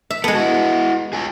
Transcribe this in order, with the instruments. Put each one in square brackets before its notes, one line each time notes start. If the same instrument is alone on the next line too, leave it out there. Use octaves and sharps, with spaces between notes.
[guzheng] E5
[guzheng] G#3 B3 [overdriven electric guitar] A4
[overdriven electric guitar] E4 F#4
F4 G#4